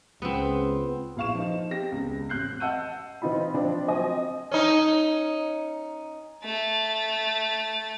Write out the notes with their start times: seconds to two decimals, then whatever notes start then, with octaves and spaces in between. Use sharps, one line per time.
0.22 C#2 B3 C4
1.16 A#1 E4 F5 C#6 E7
1.35 F3 D#4
1.70 C4 G4 A#6
1.92 E1 C#2
2.29 A1 F2 F#6 G6 C7
2.60 D#5 F#5 A5 E6 G6 D#7
3.22 E3 C4 D#4 F4 B5
3.54 F3 C4 D4
3.88 F3 F#3 C4 D#5 G#5
4.51 C#4 D#4
6.45 A3 A6